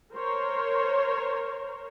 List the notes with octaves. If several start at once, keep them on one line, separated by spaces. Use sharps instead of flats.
A#4 C5 C#5